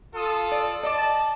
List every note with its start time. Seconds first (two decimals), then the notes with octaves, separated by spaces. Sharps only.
0.14 F4 A4 D#6
0.52 D5
0.83 D5 D#5 A5 D6